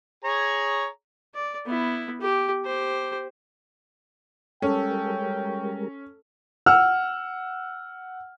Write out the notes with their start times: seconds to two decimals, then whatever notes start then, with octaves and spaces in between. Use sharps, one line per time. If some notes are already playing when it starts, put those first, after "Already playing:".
0.24 G#4 C#5 A#5
1.34 D5
1.66 B3 E4
2.20 G4
2.65 G4 C5
4.62 G3 G#3 C#4 A4 A#4 G5
6.66 F#5 E6 F6